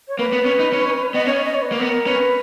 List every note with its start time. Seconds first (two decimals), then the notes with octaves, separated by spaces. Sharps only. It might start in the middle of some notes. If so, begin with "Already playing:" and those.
0.08 C#5
0.18 A#3 B4
0.32 B3
0.45 C#4
0.59 D#4
0.73 C#4
1.13 B3 D#5
1.26 C#4 C#5
1.44 D#5
1.54 C#5
1.62 B4
1.72 A#3
1.80 B3 A#4
2.07 C#4 B4